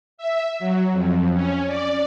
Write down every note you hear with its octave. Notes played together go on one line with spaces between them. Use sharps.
E5
F#3
F2
C#4
D5